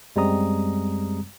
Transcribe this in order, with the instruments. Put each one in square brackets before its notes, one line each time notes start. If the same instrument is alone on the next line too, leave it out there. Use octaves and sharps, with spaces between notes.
[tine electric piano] F#2 G3 G#3 C4 A#5 D#6